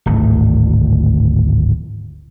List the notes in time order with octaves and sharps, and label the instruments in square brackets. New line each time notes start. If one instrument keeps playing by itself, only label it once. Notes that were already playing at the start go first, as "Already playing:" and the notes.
[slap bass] D1 G#1 D2